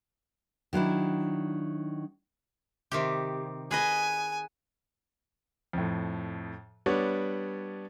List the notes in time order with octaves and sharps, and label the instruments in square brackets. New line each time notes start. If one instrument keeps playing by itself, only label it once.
[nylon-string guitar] D#3 F#3 D4 E4
[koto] C3 D#3 G4
[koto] G#4 B4 D#5 [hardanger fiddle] G#5
[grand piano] F2 A2
G3 B3 D4 C#5